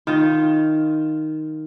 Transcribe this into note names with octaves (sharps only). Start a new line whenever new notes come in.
D#3 F4